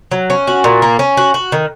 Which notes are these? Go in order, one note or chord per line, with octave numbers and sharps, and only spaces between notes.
F#3
C#4
F#4
A#2
A#3
C#4
F#4
F#4
D#3